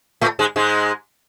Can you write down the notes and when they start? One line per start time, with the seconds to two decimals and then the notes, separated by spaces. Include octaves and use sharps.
0.21 A2 A3
0.39 G#2 G#3
0.56 G#2 G#3